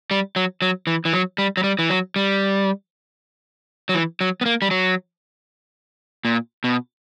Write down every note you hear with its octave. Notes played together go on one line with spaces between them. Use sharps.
G3
F#3
F#3
E3
E3
F#3
G3
F#3
G3
E3
F#3
G3
F#3
E3
F#3
B3
A#3
G3
F#3
A#2
B2